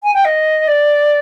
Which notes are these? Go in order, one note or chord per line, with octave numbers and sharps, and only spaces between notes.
G#5
G5
D#5
D5